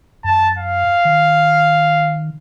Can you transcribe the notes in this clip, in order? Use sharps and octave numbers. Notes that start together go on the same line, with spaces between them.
F#2 A5
F5
D#3